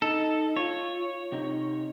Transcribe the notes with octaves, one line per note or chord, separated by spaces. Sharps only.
D#4 A4
F4 C#5
C3 D#4